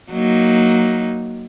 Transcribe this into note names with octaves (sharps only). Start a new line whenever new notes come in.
F#3 A#3 D#4